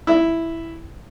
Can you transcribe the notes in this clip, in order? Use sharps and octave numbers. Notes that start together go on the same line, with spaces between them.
E4